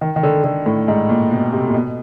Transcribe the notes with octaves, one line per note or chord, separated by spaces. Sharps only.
D#3
D#3
D3
D3
A2
G#2
A#2
B2
C3
A#2
B2